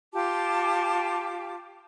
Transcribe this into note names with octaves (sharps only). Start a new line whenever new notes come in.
F4 G4 A5 D6